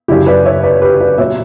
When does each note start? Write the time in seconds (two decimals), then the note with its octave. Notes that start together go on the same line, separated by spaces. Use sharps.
0.08 F#2 C#3 F#3 E4 G4
0.26 B4 D5
0.46 C#5 E5
0.63 B4 D5
0.82 G4 B4
1.00 B4 D5
1.18 A#2 F#3 C#5 E5